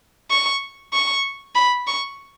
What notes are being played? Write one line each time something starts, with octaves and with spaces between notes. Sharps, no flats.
C#6
C#6
B5
C#6